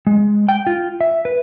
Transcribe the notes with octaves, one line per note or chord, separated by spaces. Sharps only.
G#3
G5
F4
E5
B4